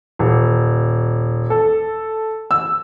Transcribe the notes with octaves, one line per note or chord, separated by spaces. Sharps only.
D#1
A4
E6